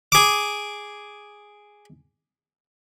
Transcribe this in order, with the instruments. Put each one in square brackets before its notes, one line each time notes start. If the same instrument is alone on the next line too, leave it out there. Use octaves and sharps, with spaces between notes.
[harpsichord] G#4 D6